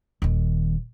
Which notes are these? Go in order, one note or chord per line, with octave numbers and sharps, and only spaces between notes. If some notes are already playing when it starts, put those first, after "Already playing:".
D#1 D#3